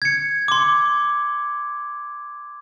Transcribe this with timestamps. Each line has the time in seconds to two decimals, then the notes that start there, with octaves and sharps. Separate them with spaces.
0.02 G#6 C#7
0.48 C6 D6